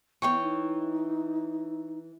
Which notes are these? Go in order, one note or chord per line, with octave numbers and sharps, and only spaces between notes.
E3 B3 C#5 G5 C#6
D#4